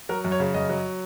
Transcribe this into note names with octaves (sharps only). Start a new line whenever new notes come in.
F#3 A#4
F#2
C#5
C#3
F#2 D#5
F#3